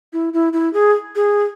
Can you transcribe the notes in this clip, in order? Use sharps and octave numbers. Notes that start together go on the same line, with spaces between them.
E4
E4
E4
G#4
G#4